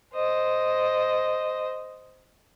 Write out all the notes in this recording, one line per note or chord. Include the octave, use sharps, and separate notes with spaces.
C5 D#5